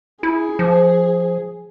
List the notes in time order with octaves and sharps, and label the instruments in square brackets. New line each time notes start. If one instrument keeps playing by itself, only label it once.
[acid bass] E4 [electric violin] G#4
[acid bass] F3